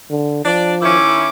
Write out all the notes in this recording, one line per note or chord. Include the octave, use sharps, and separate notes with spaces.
D3
F3 D4 D5
D#3 C#4 E4 D6